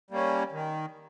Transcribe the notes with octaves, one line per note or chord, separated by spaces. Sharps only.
G3 A#3 C#4
D#3